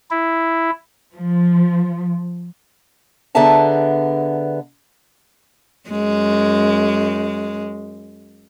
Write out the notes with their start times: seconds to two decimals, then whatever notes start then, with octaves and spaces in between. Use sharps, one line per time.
0.11 E4
1.16 F3
3.35 D3 B3 G#4 E5 A5 A#5
5.89 F#2 G#3